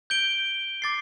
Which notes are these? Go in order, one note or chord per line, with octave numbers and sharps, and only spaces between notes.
G6 D7 G7
D6 A6 C7